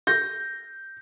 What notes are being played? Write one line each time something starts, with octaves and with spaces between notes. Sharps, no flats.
G6 A#6